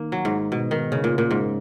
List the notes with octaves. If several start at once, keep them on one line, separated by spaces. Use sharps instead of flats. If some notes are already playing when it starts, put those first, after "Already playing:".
Already playing: D#3 A#3
F#3
G#2
B2
D#3
C#3
A#2
A#2
G#2